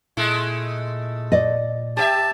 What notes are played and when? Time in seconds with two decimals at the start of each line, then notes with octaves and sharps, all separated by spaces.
0.17 A#2 G#3 A3 E4
1.32 D5 D#5
1.97 G4 A#4 E5 A5